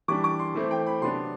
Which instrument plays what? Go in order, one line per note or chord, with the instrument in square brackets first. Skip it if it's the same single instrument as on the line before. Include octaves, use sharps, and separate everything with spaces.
[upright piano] E3 G3 D4 D6
D6
C6
E3 A3 C4 E4
G5
B5
C3 F#3 B3 D4 C6